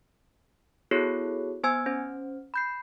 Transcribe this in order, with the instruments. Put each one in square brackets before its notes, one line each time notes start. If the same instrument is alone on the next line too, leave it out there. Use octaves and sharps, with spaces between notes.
[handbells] B3 E4 F#4 G#4 A4 C#5
B3 C5 G#5 E6 G#6
C#4 C5
B5 G6 C7